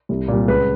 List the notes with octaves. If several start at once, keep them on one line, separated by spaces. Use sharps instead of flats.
C2
A#2 G3
C#2 B4